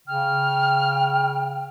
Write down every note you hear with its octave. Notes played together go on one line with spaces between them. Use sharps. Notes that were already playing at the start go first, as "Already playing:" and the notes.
C#3 G5 F6